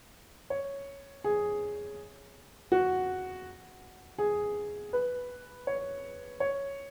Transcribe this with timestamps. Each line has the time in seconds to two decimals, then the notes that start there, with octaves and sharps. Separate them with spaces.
0.50 C#5
1.24 G#4
2.72 F#4
4.18 G#4
4.93 B4
5.67 C#5
6.40 C#5